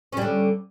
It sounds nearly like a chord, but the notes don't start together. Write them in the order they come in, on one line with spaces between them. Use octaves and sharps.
C#4 G3 D3